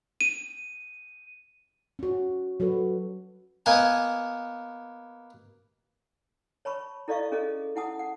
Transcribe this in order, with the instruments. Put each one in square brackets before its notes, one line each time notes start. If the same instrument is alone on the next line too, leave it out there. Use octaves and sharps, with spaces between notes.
[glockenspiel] D#7
[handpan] C#4 F#4
F#3 F#4 A4 B4
[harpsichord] A#3 B3 D#5 G#5 A5
[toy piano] C#5 A5 B5 C#6
E4 A4 D5 D#5 F5 C#6
C#4 G#4 A4 D#5
E4 F#5 A5 D#6
F#5